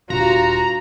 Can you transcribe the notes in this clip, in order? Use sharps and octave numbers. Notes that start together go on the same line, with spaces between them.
D#1 G2 F4 F#4 A#5